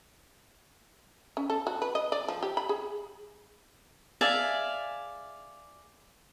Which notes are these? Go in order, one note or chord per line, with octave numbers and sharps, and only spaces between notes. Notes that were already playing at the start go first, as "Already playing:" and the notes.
C#4
A4
F#4
B4
D#5
D5
F3
G4
B5
G#4
G#4 D5 E5 F5